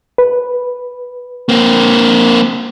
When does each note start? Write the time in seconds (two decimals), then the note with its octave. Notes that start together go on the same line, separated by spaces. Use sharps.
0.18 B4
1.49 A#3 C4